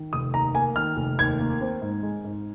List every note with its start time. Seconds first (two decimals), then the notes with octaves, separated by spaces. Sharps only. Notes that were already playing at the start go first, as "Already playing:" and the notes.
Already playing: D#3
0.13 F1 D#6
0.34 D#2 A#5
0.54 A#3 G#5
0.76 D#3 F6
0.97 F1
1.19 D#2 G#6
1.39 A#3
1.61 C4
1.82 G#2
2.03 G#3
2.24 G#2